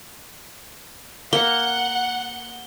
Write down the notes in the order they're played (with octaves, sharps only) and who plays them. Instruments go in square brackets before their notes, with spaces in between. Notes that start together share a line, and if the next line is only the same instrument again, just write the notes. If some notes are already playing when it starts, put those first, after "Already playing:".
[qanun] A#3 [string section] F#5 [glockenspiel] G7